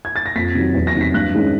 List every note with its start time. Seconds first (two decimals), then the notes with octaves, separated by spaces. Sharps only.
0.05 G#6
0.16 A6
0.26 A#6
0.36 F2 B6
0.55 C3 D#3 F#3
0.74 E2
0.87 A#6
0.94 C3 D#3 F#3
1.01 B6
1.14 G2 F#6
1.33 D#3 G#3 C#4